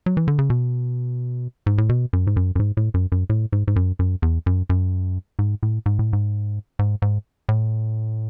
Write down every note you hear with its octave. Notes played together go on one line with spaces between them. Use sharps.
F#3
E3
D3
C#3
B2
G#2
A2
B2
F#2
G#2
F#2
F#2
G#2
A2
F#2
F#2
A2
G#2
G#2
F#2
F#2
E2
F#2
F#2
G#2
A2
G#2
A2
G#2
G#2
G#2
A2